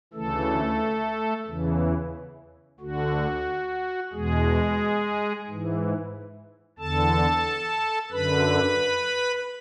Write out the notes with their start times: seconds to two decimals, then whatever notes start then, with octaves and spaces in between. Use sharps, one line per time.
0.13 D2 C#3 E3 A3 A4
1.47 E2 C#3 E3
2.80 D2 D3 F#4
4.13 E2 B2 G#3 G#4
5.47 G#2 E3
6.79 E2 D3 A4 A5
8.12 F#2 D3 B4 B5